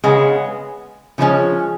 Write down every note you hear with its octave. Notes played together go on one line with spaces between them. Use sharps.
C#3 G#3 B3
C#3 F3 G#3 C#4